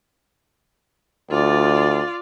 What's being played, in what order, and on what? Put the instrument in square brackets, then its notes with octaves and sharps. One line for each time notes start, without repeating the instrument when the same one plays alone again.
[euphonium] D2 [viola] F4 D5